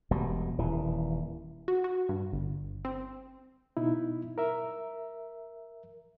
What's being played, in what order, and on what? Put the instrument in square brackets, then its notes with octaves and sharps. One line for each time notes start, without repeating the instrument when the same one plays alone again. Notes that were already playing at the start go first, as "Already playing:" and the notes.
[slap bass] E1 B2 G3
D#1 E3
[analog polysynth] F#4
F#4
G2
G1
C4
[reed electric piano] B2 D#4 E4
A#4 E5